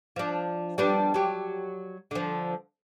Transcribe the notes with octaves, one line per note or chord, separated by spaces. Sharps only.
F3 D4
G3 B3 D4
F#3 G4
D3 F3